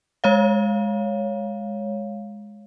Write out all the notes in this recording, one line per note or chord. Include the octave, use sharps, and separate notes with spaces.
G#3 C#5 F5